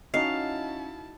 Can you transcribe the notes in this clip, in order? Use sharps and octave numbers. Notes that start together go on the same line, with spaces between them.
C#4 D#4 E4 F#4 D#5 F5 A5